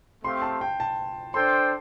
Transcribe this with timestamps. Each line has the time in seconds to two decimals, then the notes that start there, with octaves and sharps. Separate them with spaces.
0.23 A3 C4 G4 F5 C6
0.42 A5
0.61 G5
0.80 A5
1.34 D4 A4 C5 G5 C6